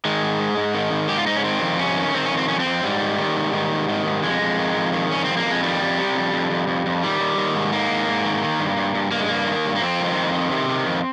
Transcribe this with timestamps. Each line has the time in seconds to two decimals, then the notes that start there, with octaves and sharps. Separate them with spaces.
0.05 D#3 G#3
0.23 G#2
0.40 G#2
0.57 G#2
0.74 D#3
0.92 G#2
1.09 G#2 G4
1.18 F4
1.27 G#2 D#4
1.36 C#4
1.44 D#3 C4
1.62 F2
1.79 C3 C#4
1.97 D#3
2.14 D#3 C4
2.25 C#4
2.31 F2
2.37 C4
2.48 F2 C#4
2.59 C4
2.66 F2
2.83 G#2 G3
3.02 D#3
3.18 D#3
3.36 G#2
3.53 D#3
3.72 G#2
3.89 D#3
4.06 G#2
4.23 F2 G#3
4.41 F2
4.59 D#3
4.77 F2
4.93 D#3
5.11 F2 C#4
5.25 F2 C4
5.37 A#3
5.45 F2
5.51 G#3
5.63 D#3 G3
5.81 F2
5.98 C3
6.15 F2
6.33 F2
6.51 F2
6.68 F2
6.86 F2
7.03 D#3 G3
7.20 D#3
7.38 D#3
7.55 G#2
7.73 D#3 A#3
7.90 G#2
8.08 G#2
8.25 D#3
8.43 D#3
8.60 G2
8.77 G2
8.95 G2
9.12 G2 A#3
9.20 G#3
9.28 G2 A#3
9.47 D#3
9.65 G2
9.76 A#3
9.82 F2 C4
10.00 D#3
10.17 F2
10.34 D#3
10.52 C3
10.69 D#3
10.86 F2